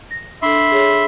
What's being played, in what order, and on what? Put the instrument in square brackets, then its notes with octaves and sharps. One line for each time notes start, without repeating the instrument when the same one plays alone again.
[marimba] A#6
[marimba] D4 A4 [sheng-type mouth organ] E5 B5 C6
[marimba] G#4 C#5